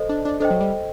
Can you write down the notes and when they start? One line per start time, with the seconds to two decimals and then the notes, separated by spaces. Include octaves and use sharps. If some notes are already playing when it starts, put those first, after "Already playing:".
Already playing: A4 C5 D#5
0.09 D4
0.25 D4
0.40 D4 A4 C5 D#5 G5
0.51 F#3
0.61 G3